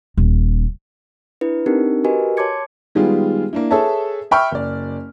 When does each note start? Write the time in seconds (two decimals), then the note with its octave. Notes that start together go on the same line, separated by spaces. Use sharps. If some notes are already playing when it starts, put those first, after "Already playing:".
0.17 D#1
1.41 D4 E4 B4
1.66 C4 D4 D#4 G4 A#4
2.04 F#4 G4 A#4 B4 D#5 G#5
2.37 C#5 A5 C6 D6 G#6 C#7
2.95 D#3 G3 G#3 B3 F4 G#4
3.53 A#3 D4 E4
3.71 G#4 A4 B4 C#5 E5 A5
4.31 E5 G5 B5 C#6 F6
4.52 F#1 D5